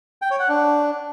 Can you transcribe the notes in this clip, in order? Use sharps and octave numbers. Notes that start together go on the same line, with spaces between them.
G5
C#5
F#5
D4